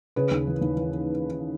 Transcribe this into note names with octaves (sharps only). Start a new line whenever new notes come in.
C#3 G#4 B4
D#2
E3
D#2
E3